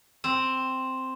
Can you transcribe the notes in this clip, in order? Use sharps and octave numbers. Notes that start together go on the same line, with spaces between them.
C4